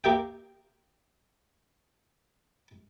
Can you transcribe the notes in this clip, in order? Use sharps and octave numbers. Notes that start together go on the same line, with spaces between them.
A#3 G4 E5 G5